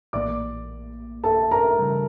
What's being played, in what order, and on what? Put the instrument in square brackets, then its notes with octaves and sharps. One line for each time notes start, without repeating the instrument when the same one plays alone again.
[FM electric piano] A#1 A2 E3 A#3 [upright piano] D5 D6
[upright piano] A4 A5
A#4 A#5
[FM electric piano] C#3 E3 G3